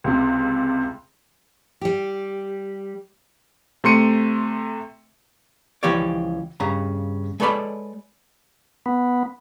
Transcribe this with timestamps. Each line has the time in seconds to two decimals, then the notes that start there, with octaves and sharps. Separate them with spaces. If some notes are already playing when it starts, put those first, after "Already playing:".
0.04 C#2 C3
1.81 G3 G4
3.84 C3 A3 C6 C#7 D#7
5.83 C#2 E3 F3 G4 C#5 D5
6.60 G2 C#3 A#5
7.40 G#3 A4 B4 C#5 D5 B5
8.86 B3